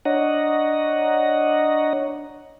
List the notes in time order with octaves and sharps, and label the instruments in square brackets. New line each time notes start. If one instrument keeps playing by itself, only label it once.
[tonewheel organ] D4 C#5 D#5 F#5 A#5